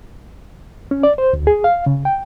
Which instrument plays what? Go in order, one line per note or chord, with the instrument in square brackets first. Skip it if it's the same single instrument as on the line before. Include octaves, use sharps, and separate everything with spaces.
[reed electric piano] C#4
D5
C5
D2
G#4
F5
C#3
G5